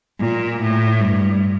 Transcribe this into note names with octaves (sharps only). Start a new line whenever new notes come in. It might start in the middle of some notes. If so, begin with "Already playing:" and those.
A#2
A2
G2